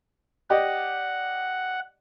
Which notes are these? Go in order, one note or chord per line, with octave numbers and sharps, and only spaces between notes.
G4 D5 D#5 F#5